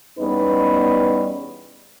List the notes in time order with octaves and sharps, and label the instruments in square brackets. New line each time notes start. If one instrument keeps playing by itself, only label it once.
[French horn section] E2 G3 B3 C#4 D#4 B4